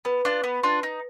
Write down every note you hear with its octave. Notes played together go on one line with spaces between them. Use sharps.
B3 B4
D4 F4
B3
D4 F4
D#4